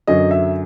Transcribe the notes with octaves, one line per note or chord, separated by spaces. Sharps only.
F#2 D3 F#3 D#5
E5